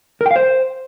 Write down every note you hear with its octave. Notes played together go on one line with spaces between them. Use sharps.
A#4
G5
F5
C5